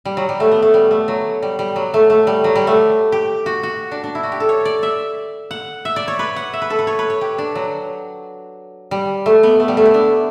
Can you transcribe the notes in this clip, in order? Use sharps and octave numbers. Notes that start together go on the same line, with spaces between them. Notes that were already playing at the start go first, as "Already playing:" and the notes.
G3
F#3
G3
A3
B3
A3
G3
A3
F#3
G3
G3
F#3
A3
A3
G3
F#3
G3
A3
G4
F#4
F#4
D4
D4
E4
F#4
G4
A4
C#5
D5
E5
F#5
E5
D5
C#5
B4
F#5
E5
B4
A4
B4
C#5
B4
C#5
G4
D4
F#3
G3
A3
B3
A3
G3
A3
E4
D4